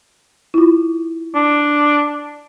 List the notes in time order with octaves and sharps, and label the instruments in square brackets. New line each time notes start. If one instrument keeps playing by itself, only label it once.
[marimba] E4 F4
[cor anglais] D4